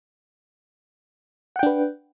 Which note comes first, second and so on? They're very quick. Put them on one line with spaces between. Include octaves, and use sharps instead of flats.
F#5 G5 D4 B4